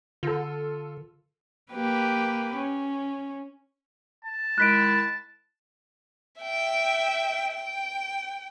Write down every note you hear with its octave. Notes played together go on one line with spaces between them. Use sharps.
D3 F4 A4
A#3 G4 B4
C#4
A5
D#3 G#3 E4 F#6 B6 D7
E5 G5
G5